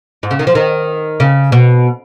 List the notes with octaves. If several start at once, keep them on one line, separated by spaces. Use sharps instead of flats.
G#2
C#3
D#3
F3
D#3
C#3
B2